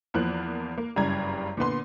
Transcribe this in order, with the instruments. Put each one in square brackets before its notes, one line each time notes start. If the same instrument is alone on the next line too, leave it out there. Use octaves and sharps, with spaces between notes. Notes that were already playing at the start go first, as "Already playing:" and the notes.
[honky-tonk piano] E2 F3 A#3 F#6
A#3
F#1 G2 C#3 D5 A#5 G#6
A#2 D3 B3 C6